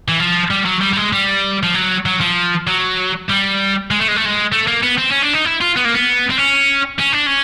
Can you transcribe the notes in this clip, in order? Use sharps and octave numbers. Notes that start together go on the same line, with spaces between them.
E3
F3
G3
F#3
G3
G3
G#3
G3
F3
F#3
F#3
F3
F#3
G3
G#3
A3
G#3
A3
G#3
A3
A#3
B3
C4
C#4
D4
D#4
E4
F4
B3
A#3
B3
C4
C#4
C#4
D4
C#4